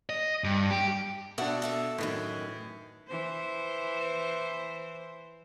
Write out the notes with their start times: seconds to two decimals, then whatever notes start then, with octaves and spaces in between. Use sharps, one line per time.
0.10 D#5
0.44 G2
0.70 G4
1.38 B2 D4 F#4 E5 F#5
1.62 A4 E5 A5
1.98 F#2 A2 D#3 E3
3.08 E3 C5